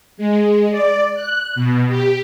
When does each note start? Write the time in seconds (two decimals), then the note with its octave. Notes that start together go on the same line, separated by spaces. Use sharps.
0.17 G#3
0.71 D5
1.14 F#6
1.55 B2
1.88 G4